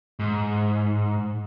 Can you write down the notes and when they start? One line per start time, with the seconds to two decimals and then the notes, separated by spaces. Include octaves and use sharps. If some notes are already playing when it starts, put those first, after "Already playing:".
0.19 G#2